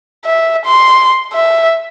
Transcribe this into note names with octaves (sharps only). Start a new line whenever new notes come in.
E5
C6
E5